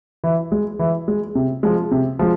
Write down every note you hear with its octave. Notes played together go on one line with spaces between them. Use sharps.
E3
G#3
E3
G#3
C3
F3 G#3
C3
F3 G#3